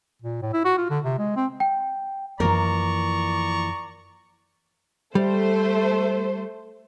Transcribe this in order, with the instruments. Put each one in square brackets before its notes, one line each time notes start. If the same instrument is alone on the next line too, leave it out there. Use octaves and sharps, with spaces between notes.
[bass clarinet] A#2
A2
E4
F#4
F4
D3
C3
G#3
C4
[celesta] G5
[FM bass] F#2 [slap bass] E3 F3 A#3 [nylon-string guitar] A#4 [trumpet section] D5 A#5 C#6
[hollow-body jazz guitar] G3 [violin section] A3 C5